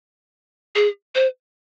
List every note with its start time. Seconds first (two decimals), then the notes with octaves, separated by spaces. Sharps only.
0.75 G#4
1.15 C5